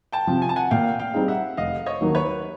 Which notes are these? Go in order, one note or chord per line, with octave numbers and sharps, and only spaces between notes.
G5 A5
C3 F3
G#5
A5
F#5 G#5
A#2 F5 G5
F5 G5
G3 C4 D#4 G#4
E5 F#5
F1 D#5 F5
C#5 D#5
D#2 D#3 F#3 A#3
B4 C#5